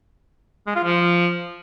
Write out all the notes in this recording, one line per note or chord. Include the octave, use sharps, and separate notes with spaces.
G#3
F4
F3